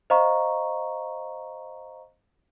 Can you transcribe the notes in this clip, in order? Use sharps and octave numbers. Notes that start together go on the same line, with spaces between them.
C5 D#5 F5 A#5 C#6